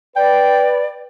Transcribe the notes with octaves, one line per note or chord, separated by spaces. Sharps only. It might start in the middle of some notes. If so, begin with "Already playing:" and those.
B4 D5 G5